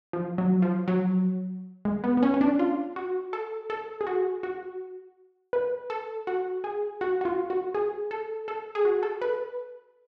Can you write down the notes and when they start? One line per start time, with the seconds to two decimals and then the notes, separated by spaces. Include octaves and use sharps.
0.13 F3
0.38 F#3
0.62 F3
0.88 F#3
1.85 G#3
2.04 B3
2.17 B3
2.23 C#4
2.34 C#4
2.41 D4
2.59 F4
2.96 F#4
3.33 A4
3.70 A4
4.01 G#4
4.07 F#4
4.43 F#4
5.53 B4
5.90 A4
6.27 F#4
6.64 G#4
7.01 F#4
7.21 F#4
7.25 F4
7.50 F#4
7.75 G#4
8.11 A4
8.48 A4
8.75 G#4
8.85 F#4
9.03 A4
9.22 B4